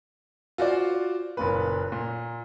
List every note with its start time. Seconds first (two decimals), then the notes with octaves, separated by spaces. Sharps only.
0.58 F4 F#4 C5 D5
1.37 F#1 A#2 B4
1.92 A#2